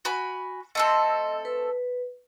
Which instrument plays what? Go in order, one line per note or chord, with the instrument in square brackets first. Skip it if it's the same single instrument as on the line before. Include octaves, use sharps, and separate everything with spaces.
[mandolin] F#4 G#5 B5
[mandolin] A3 C4 A4 [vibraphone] D#5
[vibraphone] B4